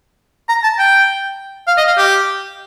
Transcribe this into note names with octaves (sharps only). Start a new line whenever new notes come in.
A#5
A5
G5
F5
D#5
F5
G4